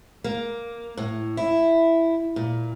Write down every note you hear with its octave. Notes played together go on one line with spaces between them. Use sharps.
A#3
A2
E4
A#2